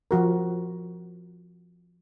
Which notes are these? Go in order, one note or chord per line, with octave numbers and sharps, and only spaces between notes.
F3 F#4 A#4